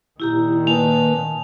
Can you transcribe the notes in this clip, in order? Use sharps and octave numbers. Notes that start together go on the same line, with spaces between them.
A#2 D#3 E4 G4 A#5
A#3 B4 G#5 A5 F7